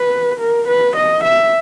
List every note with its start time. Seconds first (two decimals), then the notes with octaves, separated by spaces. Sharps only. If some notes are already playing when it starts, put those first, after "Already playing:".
Already playing: B4
0.40 A#4
0.68 B4
0.96 D#5
1.24 E5